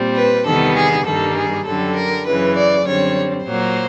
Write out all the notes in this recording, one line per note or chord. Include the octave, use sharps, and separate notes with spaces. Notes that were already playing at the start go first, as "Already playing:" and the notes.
Already playing: A#2 G3 C4
B4
E2 C3 D#3 G3 B3 A4
G#4
G2 D#3 G3 A#3 A4
G#4
F#2 D3 G3 A4
A#4
F#2 C#3 E3 B4
D5
F#2 D3 G3 C4 C#5
A#2 F#3 A#3 C5